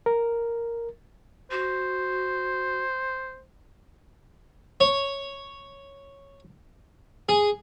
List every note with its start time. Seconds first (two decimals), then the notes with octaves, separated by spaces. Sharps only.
0.06 A#4
1.51 F#4 C5
4.80 C#5
7.29 G#4